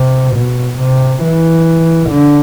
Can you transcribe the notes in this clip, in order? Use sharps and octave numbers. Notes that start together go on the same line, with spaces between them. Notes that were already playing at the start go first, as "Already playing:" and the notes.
Already playing: C3
B2
C3
E3
D3